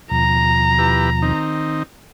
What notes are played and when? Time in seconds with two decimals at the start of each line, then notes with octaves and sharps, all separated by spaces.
0.11 D#2 B2 F3 A#5
0.78 E4 G4 B4
1.22 D#3 C4 D#4